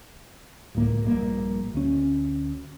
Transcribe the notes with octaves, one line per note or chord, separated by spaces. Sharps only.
D1 C#2 A2 A#3
A#1 G2 A#3
D2 C#4